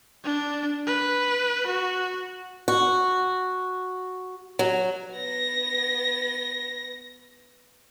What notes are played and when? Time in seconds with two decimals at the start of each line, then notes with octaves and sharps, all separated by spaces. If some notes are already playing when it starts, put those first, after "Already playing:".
0.24 D4
0.86 B4
1.66 F#4
2.68 F#4
4.59 F#3
5.12 B3 A#6